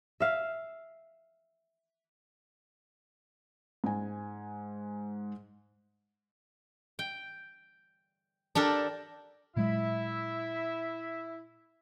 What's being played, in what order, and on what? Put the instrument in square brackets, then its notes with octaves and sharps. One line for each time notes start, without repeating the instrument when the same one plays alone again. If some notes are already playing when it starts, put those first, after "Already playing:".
[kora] E5 F5
[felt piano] G#2 G#5
[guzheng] G5
D4 G4 A4 A#4
[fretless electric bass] A#2 F#3 G#3 [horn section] E4 E5